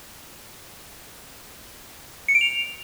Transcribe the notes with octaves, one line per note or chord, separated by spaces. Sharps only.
C#7
D7
F7